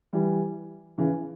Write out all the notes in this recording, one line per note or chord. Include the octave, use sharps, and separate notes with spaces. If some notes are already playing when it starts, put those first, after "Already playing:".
E3 G3
C#3 E3